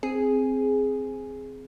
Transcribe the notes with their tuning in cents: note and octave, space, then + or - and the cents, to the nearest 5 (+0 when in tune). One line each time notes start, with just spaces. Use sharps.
C4 +0 G#4 +0